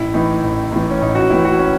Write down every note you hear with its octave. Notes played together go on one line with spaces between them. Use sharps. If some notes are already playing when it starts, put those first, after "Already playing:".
Already playing: A1 E4
A2 E3 D#4
A1
A2 E3
C#4
A1 D#4
F#4
A2 E3 E4
F#4
C#4